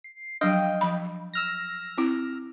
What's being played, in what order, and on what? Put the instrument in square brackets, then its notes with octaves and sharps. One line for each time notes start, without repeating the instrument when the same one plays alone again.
[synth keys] C7
[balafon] F3 F#3 D4 [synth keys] D#5 F5 G5
[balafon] F3 B5
[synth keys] E6 F6 A#6
[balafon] C4 E4